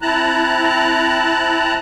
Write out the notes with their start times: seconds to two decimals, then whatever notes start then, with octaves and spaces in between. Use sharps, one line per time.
0.02 C4 E4 A5 A#5 F#6